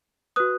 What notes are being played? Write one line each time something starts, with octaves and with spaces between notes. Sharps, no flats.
F#4 B4 D#6 F#6